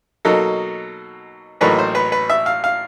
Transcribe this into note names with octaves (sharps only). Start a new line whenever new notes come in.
B2 F#3 A#3 D#4 A4
A1 A2 F#3 A#3 D#4 B4
C5
B4
B4
E5
F5
F5